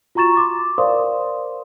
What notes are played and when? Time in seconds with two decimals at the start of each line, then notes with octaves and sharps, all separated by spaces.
0.15 F4 F#4 A#5 C#6 A6 E7
0.37 C6 D6
0.78 A#4 C5 D5 F5 C6 D#6